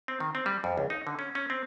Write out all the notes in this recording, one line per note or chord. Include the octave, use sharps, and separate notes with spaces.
C4
D#3
C4
G3
F2
C#2
D#4
D3
C#4
C#4
C4